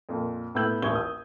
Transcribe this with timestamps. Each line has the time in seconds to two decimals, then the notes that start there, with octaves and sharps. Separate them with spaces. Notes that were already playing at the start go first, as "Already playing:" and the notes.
0.09 F2 A#2
0.55 A2 B3 E6 G6 F#7
0.82 D#1 A1 C#6 G#6 G7
0.95 D#6